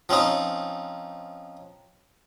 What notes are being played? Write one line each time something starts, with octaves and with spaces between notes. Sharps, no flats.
F3 C4 C#4 D#4